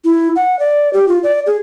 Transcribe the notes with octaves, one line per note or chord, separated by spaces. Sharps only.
E4
F#5
D5
G4
F4
D5
G#4